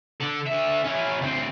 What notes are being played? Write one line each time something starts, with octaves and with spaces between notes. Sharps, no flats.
D3 A4
D3 E5
C#4 E4
D2 C4